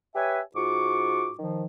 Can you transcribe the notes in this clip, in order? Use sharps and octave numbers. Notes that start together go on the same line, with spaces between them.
G4 B4 C#5 E5 G#5
G#2 F4 F#4 C#6 D6
D#3 F3